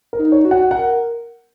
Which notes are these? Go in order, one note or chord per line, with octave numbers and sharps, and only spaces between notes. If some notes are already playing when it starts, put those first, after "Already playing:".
A#4
D#4
C#5
F#4
F#5
A#4 F#5